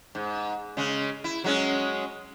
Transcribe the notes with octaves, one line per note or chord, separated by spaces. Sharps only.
G#2
C#3 G#3
E4
F#3 G#3 C#4